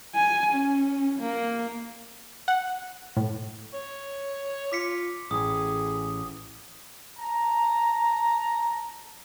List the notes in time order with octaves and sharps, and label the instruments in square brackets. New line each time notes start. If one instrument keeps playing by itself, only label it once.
[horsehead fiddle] G#5
C#4
A#3
[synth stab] F#5
A2
[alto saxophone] C#5
[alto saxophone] F4 [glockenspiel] D6 B6 C#7
[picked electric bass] A1 [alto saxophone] G#4 [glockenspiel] D#6
[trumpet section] A5 A#5